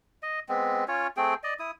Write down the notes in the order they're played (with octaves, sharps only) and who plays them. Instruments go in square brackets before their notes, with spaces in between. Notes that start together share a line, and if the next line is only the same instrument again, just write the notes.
[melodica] D#5
G#3 B3 C4
C#4 F4 C#5
A3 C4 G#4 G5
D5 D#5
E4 D#6